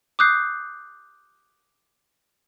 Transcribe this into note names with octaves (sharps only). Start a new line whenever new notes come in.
D6 D#6 F#6 G6 C7